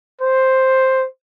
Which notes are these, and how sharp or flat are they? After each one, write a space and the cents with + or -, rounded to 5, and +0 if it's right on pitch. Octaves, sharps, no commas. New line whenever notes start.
C5 +5